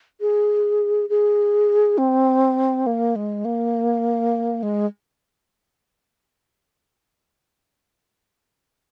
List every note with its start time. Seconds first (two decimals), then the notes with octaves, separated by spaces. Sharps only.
0.21 G#4
1.09 G#4
1.98 C4
2.86 A#3
3.16 G#3
3.45 A#3
4.63 G#3